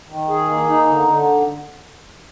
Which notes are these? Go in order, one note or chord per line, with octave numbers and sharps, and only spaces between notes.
D#3
G#4
A#3
D#4
D3
D3